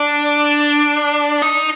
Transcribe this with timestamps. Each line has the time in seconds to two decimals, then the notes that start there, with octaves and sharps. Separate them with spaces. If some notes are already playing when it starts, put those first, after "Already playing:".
Already playing: D4
1.42 D#4